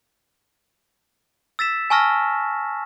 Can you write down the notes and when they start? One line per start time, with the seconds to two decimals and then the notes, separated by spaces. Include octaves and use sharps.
1.59 E6 A6 B6 E7
1.90 G#5 A5 C#6 E6 F6 A#6